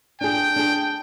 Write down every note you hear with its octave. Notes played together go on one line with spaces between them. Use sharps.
D4 G#4 G5
D4 G#4